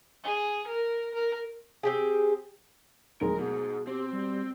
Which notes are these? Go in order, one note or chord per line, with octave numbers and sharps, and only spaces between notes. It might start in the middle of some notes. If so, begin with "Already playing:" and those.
G#4
A#4
A#4
C4 G4 G#4
D1 G#3 D#4 A#4
G#2 B2 G#4
C4 G4
G3